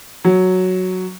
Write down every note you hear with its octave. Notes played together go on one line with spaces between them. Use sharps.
F#3